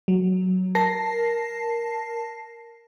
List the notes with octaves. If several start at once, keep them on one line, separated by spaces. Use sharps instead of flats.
F#3
A#4 A5 A#6 C7